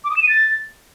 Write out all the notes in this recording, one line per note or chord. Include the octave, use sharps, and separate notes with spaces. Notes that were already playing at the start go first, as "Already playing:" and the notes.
D6
D#6
E7
D#7
A6